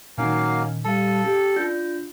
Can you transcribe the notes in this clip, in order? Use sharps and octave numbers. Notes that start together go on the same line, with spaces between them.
A#2 D#3 F#3 A#3 C#4 D#4 F5 G#5
G3 A4 F5 A5
C#4 G4
D4 F4 G6